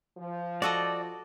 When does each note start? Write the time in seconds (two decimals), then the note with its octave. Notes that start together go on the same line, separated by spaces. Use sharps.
0.18 F3
0.62 F#4 A4 D5 D#5